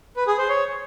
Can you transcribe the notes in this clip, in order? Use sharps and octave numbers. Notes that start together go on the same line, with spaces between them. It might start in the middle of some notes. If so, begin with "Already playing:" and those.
B4
G#4
C5
C#5